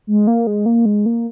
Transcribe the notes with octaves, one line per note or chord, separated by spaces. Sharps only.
G#3
A#3
G#3
A#3
G#3
A#3